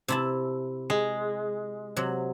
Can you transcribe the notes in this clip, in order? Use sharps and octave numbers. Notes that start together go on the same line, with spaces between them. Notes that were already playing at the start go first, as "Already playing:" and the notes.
C3 E4 A5
G#3
C3 F#3